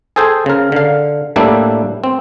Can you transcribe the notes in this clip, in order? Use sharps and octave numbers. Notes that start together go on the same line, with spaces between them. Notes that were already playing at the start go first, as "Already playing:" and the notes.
G#4 A4 C5 G5 G#5
C#3 A#4
D3 F5
A2 G3 A#3 D4 E4
C4